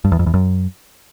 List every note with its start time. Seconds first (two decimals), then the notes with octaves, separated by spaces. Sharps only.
0.05 G2
0.12 E2
0.19 F2
0.26 E2
0.34 F#2